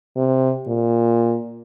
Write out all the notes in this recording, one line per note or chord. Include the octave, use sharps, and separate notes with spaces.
C3
A#2